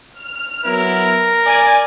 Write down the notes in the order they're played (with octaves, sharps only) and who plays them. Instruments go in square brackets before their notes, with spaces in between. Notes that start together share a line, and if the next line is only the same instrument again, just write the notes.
[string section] F6
[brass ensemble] F#3 B3 E4 [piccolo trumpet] A#4
[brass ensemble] D5 [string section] G#5